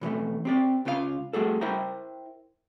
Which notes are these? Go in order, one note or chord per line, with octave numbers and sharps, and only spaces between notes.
B2 E3 G#3 A3
C4 G4 D5
C#2 C#3 F4 F#4 F5
A3 F#4 G#4 A4
E4 A#4 C5 E5 G5 A#5